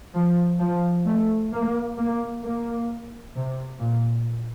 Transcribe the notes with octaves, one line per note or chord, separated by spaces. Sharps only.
F3
F3
A3
A#3
A#3
A#3
C3
A#2